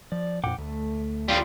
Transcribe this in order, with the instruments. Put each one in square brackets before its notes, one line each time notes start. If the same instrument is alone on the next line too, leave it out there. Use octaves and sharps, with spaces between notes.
[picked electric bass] F3 [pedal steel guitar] D5
[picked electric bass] F2 A#2 [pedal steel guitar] F#5 G5 D6
[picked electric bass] D2 [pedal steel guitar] A3
[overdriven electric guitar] G3 F4